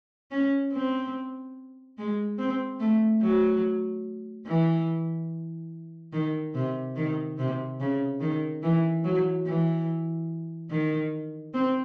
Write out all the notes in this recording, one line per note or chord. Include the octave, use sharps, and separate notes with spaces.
C#4
C4
G#3
C4
A3
F#3
E3
D#3
C3
D#3
C3
C#3
D#3
E3
F#3
E3
D#3
C4